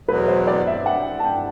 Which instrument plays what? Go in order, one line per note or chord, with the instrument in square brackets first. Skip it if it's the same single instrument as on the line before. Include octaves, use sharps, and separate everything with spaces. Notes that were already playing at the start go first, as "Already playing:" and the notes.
[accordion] E2 B2 F#3 [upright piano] B4
[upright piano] C5
D5
E5
F#5
A5
G5